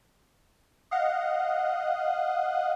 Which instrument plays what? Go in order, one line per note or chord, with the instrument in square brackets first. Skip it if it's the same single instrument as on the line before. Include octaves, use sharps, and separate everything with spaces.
[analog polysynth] D#5 F5 F#5